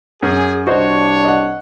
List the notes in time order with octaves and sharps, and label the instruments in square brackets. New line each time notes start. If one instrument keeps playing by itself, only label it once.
[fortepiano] F#2 [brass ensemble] G#4
[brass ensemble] C2 D4 C#5 [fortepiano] F#4 C5 D#5
[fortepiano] D#5 F#5